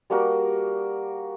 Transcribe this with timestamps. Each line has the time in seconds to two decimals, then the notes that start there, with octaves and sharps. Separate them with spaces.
0.10 G3 A#3 F#4 A#4